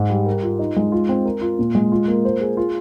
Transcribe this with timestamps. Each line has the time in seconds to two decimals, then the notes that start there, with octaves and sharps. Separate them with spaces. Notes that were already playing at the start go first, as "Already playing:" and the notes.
Already playing: G#2
0.10 G3
0.26 A#4
0.43 F4
0.59 D#4
0.77 G#3
0.92 F4
1.09 C4
1.25 A#4
1.41 F4
1.59 A#2
1.75 G#3
1.92 F4
2.08 A#3
2.25 C5
2.41 G#4
2.57 F4